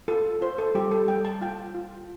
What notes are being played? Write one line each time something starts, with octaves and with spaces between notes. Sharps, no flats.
F4 A4
F4 C5
A4
G3 G4
A4
G3 G5
A5
F4 G5
F4